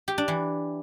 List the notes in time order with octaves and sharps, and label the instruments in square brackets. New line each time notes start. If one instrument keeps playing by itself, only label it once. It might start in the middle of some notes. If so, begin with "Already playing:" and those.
[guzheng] G4
D4
E3